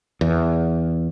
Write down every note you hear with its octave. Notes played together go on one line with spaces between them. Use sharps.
E2